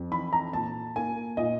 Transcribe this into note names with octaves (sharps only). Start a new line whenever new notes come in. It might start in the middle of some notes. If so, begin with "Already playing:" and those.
Already playing: F2
E3 B5
A#5
A#2 A5
A#3 G#5
A#2 D#5